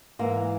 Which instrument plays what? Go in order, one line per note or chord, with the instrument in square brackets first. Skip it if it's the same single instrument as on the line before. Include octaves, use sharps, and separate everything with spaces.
[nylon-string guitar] G#2 E3 A#3